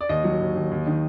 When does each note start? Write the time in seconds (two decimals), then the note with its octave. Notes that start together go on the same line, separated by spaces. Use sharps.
0.01 D5
0.09 D#2 D#5
0.24 F#3
0.41 D#2
0.55 D#2
0.71 D#2
0.87 D#3